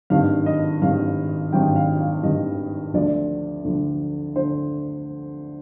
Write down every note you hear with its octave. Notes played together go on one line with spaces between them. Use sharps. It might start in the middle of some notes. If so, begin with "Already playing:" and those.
G#1 G2 D#3 F5
D#5
G#1 G2 D#3 F5
G#1 G2 D#3 G5
F5
F5
G#1 G2 D#3 D#5
D2 D3 F3 D5
D2 D3 F3
D3 C5